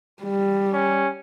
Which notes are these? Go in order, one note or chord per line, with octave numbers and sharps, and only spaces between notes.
G3
C#4